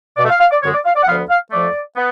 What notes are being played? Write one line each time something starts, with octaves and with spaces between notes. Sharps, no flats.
B2 D5
A3
F5
F5
D5
F#2 D3 G#3 C#5
D5
F5
D5
F#5
D2 D3 F3 B3 F5
F5
F2 F3 A3 D5
B3